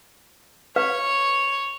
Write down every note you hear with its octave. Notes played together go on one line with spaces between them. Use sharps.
B4 C#5 F5